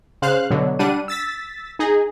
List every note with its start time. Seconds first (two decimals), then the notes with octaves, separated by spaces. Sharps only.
0.22 C#3 C5 F5 F#6
0.50 B2 D3 F#3
0.79 G3 D4 F#5 D#7
1.08 E6 A6 B6
1.79 D#4 G#4 D#5